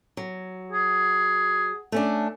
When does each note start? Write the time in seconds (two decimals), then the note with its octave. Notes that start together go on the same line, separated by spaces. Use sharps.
0.17 F#3
0.72 G#4
1.92 A3 C#4 D4